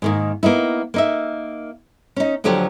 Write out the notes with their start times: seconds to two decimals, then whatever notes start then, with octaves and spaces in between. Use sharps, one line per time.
0.02 G#2 D#3 A#3
0.43 A#3 B3 D#4 E4
0.94 A#3 D#4 E5
2.16 C#4 D#4
2.44 D2 D3 F3 F#3 G4